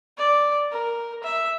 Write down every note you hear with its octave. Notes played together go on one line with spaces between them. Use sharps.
D5
A#4
E5